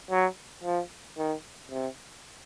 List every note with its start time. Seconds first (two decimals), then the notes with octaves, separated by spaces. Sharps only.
0.11 F#3
0.64 F3
1.18 D#3
1.71 C3